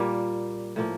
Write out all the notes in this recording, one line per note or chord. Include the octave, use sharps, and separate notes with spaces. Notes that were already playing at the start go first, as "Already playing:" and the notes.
Already playing: A#2 G3 A#3
A2 F3 A#3